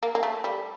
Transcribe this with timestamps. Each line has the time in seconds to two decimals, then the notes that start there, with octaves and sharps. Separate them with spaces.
0.03 A#3
0.15 A#3
0.23 A3
0.44 G3